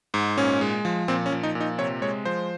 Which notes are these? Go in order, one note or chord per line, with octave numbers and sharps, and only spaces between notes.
G#2
A#2 C#4
G#3
F3
A#2 C4
C#4
F3
D#4
A#2
D#4
C3 C#5
G#3 C#5
F3 C5